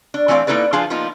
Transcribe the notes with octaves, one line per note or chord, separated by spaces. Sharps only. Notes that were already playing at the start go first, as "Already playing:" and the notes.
D4
E3 A3 C4 G#4 D5 F5
A#3 D#4 E4 A4 B4 D5
F3 D4 F4 G#4 F5
F3 A#3 B3 D#4 F4